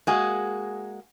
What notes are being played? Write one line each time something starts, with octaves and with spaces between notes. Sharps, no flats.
G#3 A#3 F#4 G#4